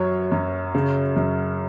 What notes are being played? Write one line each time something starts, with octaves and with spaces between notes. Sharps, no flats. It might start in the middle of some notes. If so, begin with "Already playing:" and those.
Already playing: F#2 F#3 C#5
F#2
C#3
F#2